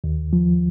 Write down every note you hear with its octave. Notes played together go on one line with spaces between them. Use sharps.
D#2
F3